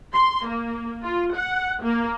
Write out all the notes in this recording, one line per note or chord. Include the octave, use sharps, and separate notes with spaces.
C6
A#3
F4
F#5
A#3